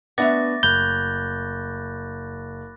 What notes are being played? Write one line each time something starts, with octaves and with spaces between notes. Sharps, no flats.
A3 B3 D4 E5 F#5 D6 A6 A#6
F#1 B5 F#6 G6